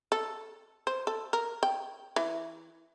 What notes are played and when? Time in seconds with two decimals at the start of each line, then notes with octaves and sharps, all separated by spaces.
0.12 A4
0.87 C5
1.07 A4
1.33 A#4
1.63 G5
2.16 E3